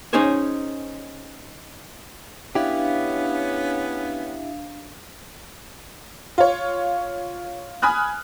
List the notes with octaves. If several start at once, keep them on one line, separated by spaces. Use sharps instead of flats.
C#4 D#4 G#4 C5 C#5
B3 C#4 D4 E4 G4 F5
F4 C#5
G#5 B5 D#6 F6 F#6